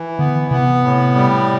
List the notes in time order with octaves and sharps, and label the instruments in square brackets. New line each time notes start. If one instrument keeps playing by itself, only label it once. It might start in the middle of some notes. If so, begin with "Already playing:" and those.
Already playing: [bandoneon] E3
[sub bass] D3 [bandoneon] B3
[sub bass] C3 [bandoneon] B3
[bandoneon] A2
G3